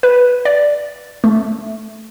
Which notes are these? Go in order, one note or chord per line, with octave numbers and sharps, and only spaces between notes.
B4
D5
A3